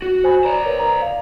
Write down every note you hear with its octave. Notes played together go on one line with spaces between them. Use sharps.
F#4
C5 G#5 B5
C5 D5 A#5
A#4 B4 C#5
A#5
F5